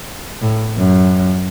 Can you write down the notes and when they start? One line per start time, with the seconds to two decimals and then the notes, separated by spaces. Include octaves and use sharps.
0.41 A2
0.78 F#2